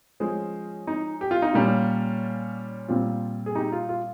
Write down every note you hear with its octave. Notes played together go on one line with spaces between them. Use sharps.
F3 G#3 C#4 G#4 C5
D#4
G4
F4
D#4
A#2 G3 A#3 C#4 F4
A#2 G3 C4 F4
G#4
D#4 G4
F4
F4